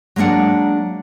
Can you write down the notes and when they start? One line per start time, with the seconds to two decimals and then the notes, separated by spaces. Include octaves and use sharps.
0.16 F#3 G#3 A#3 D4 F#5